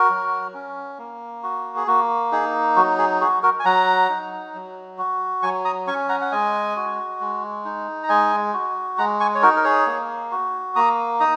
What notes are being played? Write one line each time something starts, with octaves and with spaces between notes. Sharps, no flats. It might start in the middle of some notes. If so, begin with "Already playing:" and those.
Already playing: F#4 A#4
F#3
C#4
A#3
F#4
G#4
A#3 F#4
D#4 G#4
F#3 F#4
G#4
F#4 G#4
F#4 A#4
G#5
F#3 F#5 A#5
D#4
F#3
F#4
F#3 G#5 C#6
A#5 D#6
C#4 G#5 C#6
F#5 A#5
F#5
G#3 D#5 G#5
F#4
G#3
D#4
A#5
G#3 D#5 G#5
F#4
G#3 F#5 A#5
G#5 C#6
C#5
D#4 F#4 A#4
A#4
G#4 C#5
A#3
F#4
A#3 A#5 D#6
D#4 A#5 D#6